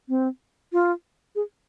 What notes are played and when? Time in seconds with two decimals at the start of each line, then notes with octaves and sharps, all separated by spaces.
0.09 C4
0.73 F4
1.36 G#4